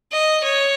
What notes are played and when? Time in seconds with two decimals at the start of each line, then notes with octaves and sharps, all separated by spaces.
0.12 D#5
0.44 C#5